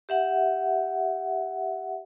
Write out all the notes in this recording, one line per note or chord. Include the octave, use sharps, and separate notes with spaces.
G4 E5 F#5